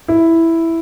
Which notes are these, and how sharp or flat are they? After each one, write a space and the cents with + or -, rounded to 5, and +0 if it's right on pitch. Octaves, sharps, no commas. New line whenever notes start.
E4 +0